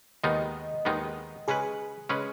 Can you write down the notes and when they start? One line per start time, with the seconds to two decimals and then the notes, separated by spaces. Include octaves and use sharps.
0.24 D#2 D#3 G#3 B3 D#4 D#5
0.85 D#2 D#3 G#3 B3 D#4
1.48 C#3 G#3 C#4 G#4 B4
2.09 C#3 G#3 C#4 B4